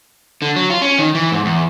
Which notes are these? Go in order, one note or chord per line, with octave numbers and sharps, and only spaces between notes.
D3
F#3
F4
C#4
D#3
E3
G#2
E2